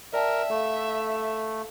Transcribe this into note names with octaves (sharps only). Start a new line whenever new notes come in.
A#4 D5 E5 G5 A5
A3 A4 F5